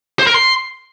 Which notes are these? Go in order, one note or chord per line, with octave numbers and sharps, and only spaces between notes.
C5
A#4
C6